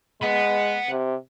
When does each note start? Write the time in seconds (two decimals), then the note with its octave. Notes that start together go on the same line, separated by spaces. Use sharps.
0.22 G#3 F#5 B5
0.90 C3